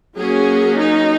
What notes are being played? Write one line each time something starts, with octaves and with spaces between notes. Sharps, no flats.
F#3 A#3 C#4 G#4
D#4